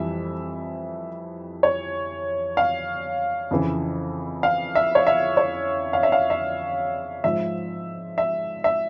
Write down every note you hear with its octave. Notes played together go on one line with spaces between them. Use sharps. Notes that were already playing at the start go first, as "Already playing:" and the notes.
Already playing: F2 E3 G3 E5
C#5
F5
F2 C#3 E3
F5
E5
C#5
E5
C#5
F5
E5
F5
E5
G#2 F3 E5
E5
E5